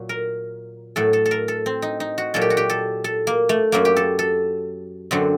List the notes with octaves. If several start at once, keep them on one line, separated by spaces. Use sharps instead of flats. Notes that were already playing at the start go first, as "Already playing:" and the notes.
Already playing: A#2 F#3
A#4
A2 F#3 A4
A4
A4
A#4
A4
C4
D#4
D#4
F#4
A#2 F#3 A4
G4
F#4
G4
A4
A4
A#3
A3
F#2 F#3 A#3
G4
A4
A4
F#2 D3 F#3 C4